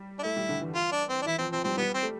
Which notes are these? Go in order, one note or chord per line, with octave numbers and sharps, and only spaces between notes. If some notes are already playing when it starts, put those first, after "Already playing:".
Already playing: G3
D4
A3 E4
G3
D3
E3
F4
D4
C4
D4
E3 E4
F3 C4
F3 C4
G3 C4
G3 B3
C4
A3